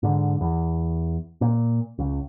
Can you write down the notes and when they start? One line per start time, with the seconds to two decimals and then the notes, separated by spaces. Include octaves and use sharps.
0.03 G#2 D3
0.41 E2
1.41 A#2
1.99 C#2